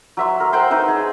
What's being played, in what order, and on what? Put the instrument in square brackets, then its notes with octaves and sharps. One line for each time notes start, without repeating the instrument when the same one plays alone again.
[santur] F#3 E5 C6
A#4
C5 F#5 G5 C6
D#4 B4 E5 F#5
G#4